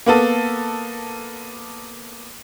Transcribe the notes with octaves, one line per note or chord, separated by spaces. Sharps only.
A#3 B3 A4